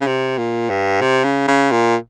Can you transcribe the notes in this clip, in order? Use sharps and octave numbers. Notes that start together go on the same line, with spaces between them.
C#3
C3
A#2
G2
C3
C#3
C#3
A#2